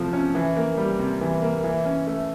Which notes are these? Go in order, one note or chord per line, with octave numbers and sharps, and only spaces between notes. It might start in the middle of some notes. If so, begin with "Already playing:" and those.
Already playing: C3 F3 A3
C#4
E3
A#3
G3
C3
E3
A#3
E3
C#4
A3